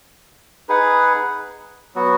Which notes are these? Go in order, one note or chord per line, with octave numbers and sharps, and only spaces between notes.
D#4 G#4 B4 F#5
F#3 B3 F#4